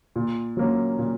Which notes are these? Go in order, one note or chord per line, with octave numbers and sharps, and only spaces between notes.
A#2
F#3 A#3 C#4
A#2